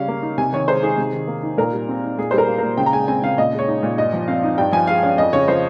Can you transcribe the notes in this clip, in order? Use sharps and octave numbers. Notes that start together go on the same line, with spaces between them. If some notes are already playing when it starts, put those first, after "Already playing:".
Already playing: C#3 G3 C#4 F5
A#3
D#4
C3 G#5
D#3 C#5
G#3 C5
D#4 G#4
C3
D#3
A#3
D#4
A#2 A#4
G3
C4
D#4
A#2 G#4
G3 C5
A#4
A#3
A#2 A#4
C#3 G5
A#5
G#3 G#5
C4 G#5
C#3 F5
A#2 D#5
G#3
C#5
D#4
A#2
G2 D#5
F3
C4 F5
D#4
G2 G5
F3 G#5
G#3 F5
C#4 F5
F2 D#5
C#3 C#5
F3 C5